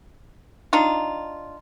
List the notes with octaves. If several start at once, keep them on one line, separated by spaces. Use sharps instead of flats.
D4 D#4 F4